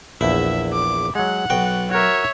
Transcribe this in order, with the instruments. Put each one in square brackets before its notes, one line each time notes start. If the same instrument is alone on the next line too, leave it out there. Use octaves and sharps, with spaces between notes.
[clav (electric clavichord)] A#1 E2 [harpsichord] E4 [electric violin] E5
[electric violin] D6
[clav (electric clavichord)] F#3 G#3 [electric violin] F#5
[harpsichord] B1 G5 [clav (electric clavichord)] F#4
[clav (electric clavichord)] F#4 A#4 [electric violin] C#5 E5